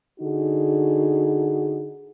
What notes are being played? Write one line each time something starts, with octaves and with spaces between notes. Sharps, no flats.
D3 D#4 F#4 G#4